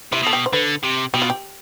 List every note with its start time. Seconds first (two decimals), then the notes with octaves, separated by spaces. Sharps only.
0.12 C3 E4
0.23 B2 A4
0.33 G4
0.46 C5
0.53 D3 B4
0.83 C3
1.14 B2 G4
1.22 F4
1.30 G4